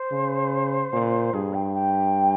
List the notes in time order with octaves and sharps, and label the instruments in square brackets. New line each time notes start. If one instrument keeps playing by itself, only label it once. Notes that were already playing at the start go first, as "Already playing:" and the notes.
Already playing: [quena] C5
[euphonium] C#3
A#2
[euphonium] G2 [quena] G#4
[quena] G5
G5